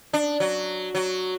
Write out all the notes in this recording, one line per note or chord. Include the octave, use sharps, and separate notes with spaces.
D4
F#3
F#3